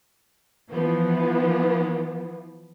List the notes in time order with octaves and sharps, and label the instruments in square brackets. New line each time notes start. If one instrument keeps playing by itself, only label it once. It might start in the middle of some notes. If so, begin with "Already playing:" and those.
[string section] E3 F3 B3